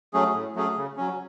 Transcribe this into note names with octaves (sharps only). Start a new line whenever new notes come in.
F#3 A3 C#4 G#4
A2
F#3 A3 C#4 G#4
C#3
F#3 C#4